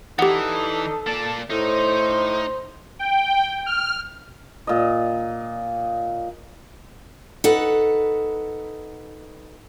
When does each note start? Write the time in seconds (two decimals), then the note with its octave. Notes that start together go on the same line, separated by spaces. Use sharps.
0.19 E3 D4 D#4 G4 A4 F#5
1.07 A#3 D5 A5
1.50 A2 D#4 C5
2.99 G5
3.66 F6
4.67 A#2 D#5
7.44 D#4 A4 B4 F#5